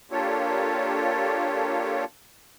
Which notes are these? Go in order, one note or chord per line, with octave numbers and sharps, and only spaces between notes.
A#3 D4 F4 G4 A4 C#5